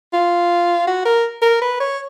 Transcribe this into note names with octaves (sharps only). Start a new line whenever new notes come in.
F4
F#4
A#4
A#4
B4
C#5